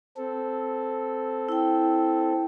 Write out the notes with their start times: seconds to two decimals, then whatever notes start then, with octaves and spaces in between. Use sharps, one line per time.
0.17 C4 A4
1.49 E4 G5